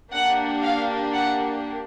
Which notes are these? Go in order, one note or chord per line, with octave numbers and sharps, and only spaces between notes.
A#3 D4 G4 F#5
F5
F#5